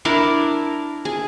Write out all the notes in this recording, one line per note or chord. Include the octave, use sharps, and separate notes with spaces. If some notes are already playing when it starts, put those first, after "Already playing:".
D4 E4 A#4 D5
G#4